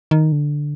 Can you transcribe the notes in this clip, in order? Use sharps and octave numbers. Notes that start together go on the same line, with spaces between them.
D#3
D3